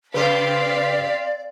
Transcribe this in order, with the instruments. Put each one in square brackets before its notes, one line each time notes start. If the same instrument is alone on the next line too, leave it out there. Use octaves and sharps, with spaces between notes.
[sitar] C#3 G4 C5 [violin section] C4 F5 B6 [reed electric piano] B4 [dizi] D5